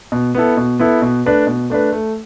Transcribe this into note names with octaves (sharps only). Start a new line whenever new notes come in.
B2
B3 E4 A4
B2
B3 E4 A4
B2
A3 D4 B4
B2
A3 D4 B4
A3